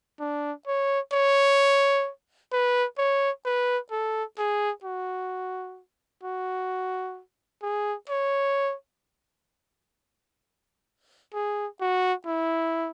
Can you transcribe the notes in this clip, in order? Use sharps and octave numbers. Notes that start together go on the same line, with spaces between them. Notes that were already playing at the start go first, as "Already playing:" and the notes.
D4
C#5
C#5
B4
C#5
B4
A4
G#4
F#4
F#4
G#4
C#5
G#4
F#4
E4